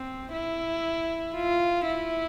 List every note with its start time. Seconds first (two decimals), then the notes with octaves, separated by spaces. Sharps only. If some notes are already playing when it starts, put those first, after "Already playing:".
Already playing: C4
0.33 E4
1.35 F4
1.87 E4